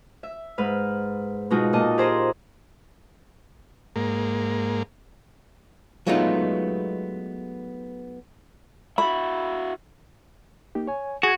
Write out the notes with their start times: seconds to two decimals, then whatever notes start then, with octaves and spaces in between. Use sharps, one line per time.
0.23 E5
0.58 G#2 B4 F6
1.50 B2 G#3 D#4 F4 F#4
1.73 A#2 D#5 A5
1.98 G4 G#4 C5 A#5
3.96 G#2 A#3
6.07 F#3 G#3 A3 B3 D#4 F4
8.98 E4 F#4 B5
10.75 A#3 D#4 G4
10.87 C#5 G#5
11.23 F#4 G#4 G#6